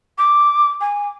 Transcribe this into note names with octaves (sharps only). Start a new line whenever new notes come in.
D6
G#5